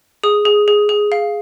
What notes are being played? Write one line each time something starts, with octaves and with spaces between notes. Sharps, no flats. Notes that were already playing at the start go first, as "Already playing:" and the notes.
G#4 D#6
G#4
G#4
G#4
F5